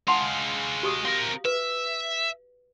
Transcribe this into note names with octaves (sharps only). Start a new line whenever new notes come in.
G#3 F5 F#5 A5 C6
F#4 G4 D#6
C4 A#4 F5
B4 E5